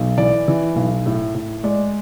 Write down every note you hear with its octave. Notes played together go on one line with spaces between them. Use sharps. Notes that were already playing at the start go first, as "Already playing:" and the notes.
Already playing: B1
E3 D5
E3
B1
A2
A2
G#3 D5